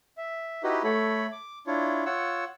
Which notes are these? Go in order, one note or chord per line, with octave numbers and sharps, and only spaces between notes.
E5
D#4 E4 F#4 G4 B4 D#5
A3 A4 C#5 B5
D6
D4 E4 F4 C#5
F4 C#5 F#5 E6